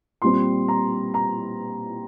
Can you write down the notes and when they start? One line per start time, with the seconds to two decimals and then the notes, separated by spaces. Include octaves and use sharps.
0.22 A#2 G3 C4 C6
0.68 A#5
1.14 A#5